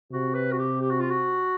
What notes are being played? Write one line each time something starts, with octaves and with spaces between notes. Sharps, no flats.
C3 F#4
B4
F#4
G4
G4
F#4
F4
F#4